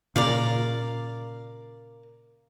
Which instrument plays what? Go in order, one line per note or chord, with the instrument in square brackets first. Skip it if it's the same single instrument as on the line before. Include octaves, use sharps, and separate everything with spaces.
[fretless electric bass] A#2 C#3 [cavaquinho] A#4 D5 F5